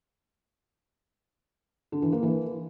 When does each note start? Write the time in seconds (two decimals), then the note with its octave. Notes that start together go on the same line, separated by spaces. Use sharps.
1.92 D3
2.02 E3
2.13 A#3
2.23 E3